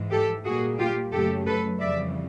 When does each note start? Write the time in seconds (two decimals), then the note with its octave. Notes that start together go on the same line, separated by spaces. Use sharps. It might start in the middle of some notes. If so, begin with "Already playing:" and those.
Already playing: G#2 E3 G#3
0.11 G4 A4
0.45 A#2 G3 A#3 F#4 G#4
0.79 F4 G4
1.13 F#2 C#3 F#3 A3 G4 A4
1.46 A4 B4
1.80 F2 C#3 E3 G3 D5 E5